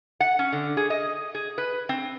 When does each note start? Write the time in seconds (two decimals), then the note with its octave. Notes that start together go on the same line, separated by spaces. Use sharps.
0.20 F#5
0.39 C#4
0.53 D3
0.77 G#4
0.90 D#5
1.35 G#4
1.58 B4
1.89 C4